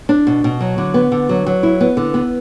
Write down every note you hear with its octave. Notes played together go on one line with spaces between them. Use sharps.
D4
B2
B2
F#3
D3
B3
D3
F#3
F#3
E4
B3
D3
B3